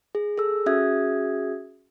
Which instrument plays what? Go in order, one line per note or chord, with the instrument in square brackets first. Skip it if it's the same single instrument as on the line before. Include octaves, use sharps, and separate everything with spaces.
[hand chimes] G#4
G#4 A4 E6
C#4 F#4 G#4 E5 D#6 G#6